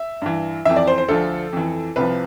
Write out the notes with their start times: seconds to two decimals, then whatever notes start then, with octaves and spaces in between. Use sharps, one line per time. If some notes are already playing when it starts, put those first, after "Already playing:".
Already playing: E5
0.22 G2 E3
0.65 F2 E3 E5
0.76 D5
0.87 C5
0.98 C5
1.08 D2 D3 F3 A4
1.53 F2 E3
1.96 C2 C3 F3 B4